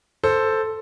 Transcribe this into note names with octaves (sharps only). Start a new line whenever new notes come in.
A4 C5